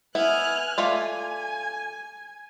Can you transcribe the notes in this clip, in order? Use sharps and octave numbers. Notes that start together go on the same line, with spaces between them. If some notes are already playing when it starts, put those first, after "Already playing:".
B3 E4 G#5 F6 F#6
A3 F4 D5 G#5